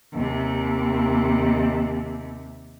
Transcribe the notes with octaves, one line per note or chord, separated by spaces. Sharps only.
D#2 C3